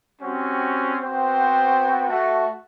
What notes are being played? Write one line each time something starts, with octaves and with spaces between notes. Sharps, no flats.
G3 C4 C#4 F#4
B3 C4 F#4 C5 G5
A3 F#4